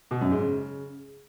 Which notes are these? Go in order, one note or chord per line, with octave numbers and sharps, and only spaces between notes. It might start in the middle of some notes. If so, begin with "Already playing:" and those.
B2
F#2
G#2
C#3